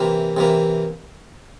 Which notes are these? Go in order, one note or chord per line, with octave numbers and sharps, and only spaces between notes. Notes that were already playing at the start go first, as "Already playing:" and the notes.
Already playing: C3 E3 A#3
C3 E3 A#3